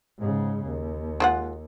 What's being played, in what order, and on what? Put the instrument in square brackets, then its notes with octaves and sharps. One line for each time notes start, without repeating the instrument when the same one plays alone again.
[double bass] G#2 C#3
D#2
[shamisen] G#3 F4 F#5